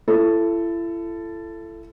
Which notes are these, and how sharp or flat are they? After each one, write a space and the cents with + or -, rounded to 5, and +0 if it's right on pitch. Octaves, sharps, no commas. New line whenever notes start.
E4 +35 A4 +0